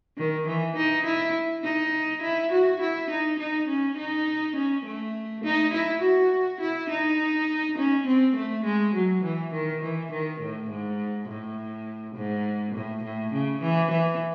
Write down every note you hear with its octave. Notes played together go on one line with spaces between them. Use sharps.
D#3
E3
D#4
E4
D#4
E4
F#4
E4
D#4
D#4
C#4
D#4
C#4
A3
D#4
E4
F#4
E4
D#4
C#4
C4
A3
G#3
F#3
E3
D#3
E3
D#3
A2
G#2
A2
G#2
A2
A2
C#3
E3
E3